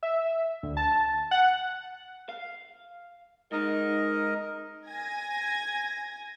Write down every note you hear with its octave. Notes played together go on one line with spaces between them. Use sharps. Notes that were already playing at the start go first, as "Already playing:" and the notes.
E5
D2
A5
F#5
F5
G#2 D#4 A#4 D#5
G#5 G#6 A#6